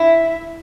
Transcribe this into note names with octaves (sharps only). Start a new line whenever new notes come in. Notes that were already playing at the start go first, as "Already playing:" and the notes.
Already playing: E4